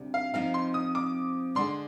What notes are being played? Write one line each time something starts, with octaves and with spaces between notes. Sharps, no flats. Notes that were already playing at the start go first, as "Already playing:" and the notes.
Already playing: D2 C3 G3
F5
C3 F3 C4 D#4 F5
C6
D#6
D6
D3 G#3 D4 C6